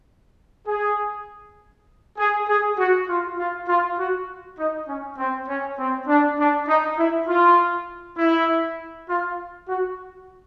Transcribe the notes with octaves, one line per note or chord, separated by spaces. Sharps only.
G#4
G#4
G#4
F#4
F4
F4
F4
F#4
D#4
C#4
C4
C#4
C4
D4
D4
D#4
E4
F4
E4
F4
F#4